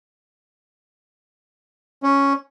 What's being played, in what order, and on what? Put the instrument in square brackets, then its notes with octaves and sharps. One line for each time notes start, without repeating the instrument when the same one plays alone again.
[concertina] C#4